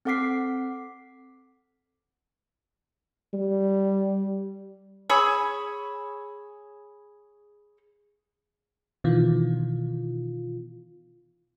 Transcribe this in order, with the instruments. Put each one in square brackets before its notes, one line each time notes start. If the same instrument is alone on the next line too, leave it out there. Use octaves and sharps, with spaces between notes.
[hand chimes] C4 A4 F#5 D6 B6 C7
[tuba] G3
[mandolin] G#4 C#5 B5 E6
[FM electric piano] B2 D#3 E3 F4